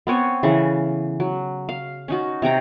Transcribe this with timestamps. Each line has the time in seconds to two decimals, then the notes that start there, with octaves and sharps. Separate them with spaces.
0.07 B3 C4 C#5 G#5
0.43 C#3 E3 A4
1.20 F#3
1.69 F5
2.08 C#4 D#4 F#4
2.42 C3 C#5 G5 A#5